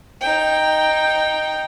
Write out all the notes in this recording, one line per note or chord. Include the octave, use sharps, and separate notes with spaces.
D#4 G5